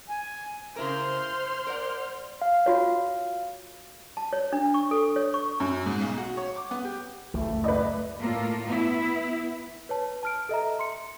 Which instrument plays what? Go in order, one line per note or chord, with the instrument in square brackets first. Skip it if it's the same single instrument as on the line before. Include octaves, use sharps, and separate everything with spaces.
[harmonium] G#5
[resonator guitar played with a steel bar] C#3 E4 A#4 [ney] C5 [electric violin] C6 F6
[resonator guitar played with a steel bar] A#4 D5 F#5
[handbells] F5
[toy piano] F4 F#4 C#5
A5
C#5
D4
C#6
A4
C#5
C#6
[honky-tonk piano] F#2
G#2
B1
F#4
C#5
D6
B3
G4
[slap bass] F#1 C#2 E3 [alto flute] A3
[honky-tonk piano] B4 D5 D#5
[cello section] A2 A#3 F4 A4
B3 E4
[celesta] B4 C#5 A5
A5 F6 D7
A4 D#5 E5 A#5
C6 C#7